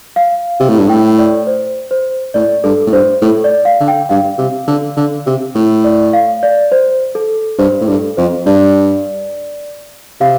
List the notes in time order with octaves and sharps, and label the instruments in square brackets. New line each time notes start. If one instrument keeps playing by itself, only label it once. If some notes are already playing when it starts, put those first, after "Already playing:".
[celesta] F5
[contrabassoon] C3
A2
G2
[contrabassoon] A2 [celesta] G5
[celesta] D5
C5
C5
[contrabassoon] A2 [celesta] D5
[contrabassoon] G2 [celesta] A4
[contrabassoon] A2
[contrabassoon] G2 [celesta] C5
[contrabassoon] A2 [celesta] A4
[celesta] D5
F5
[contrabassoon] D3
[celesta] G5
[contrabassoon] G2 [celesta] F5
[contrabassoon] C3
D3
D3
C3
A2
[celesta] D5
F5
D5
C5
A4
[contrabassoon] G2 [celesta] C5
[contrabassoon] A2
[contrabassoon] G2 [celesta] A4
[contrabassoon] F2 [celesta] C5
[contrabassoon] G2 [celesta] D5
[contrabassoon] C3 [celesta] F5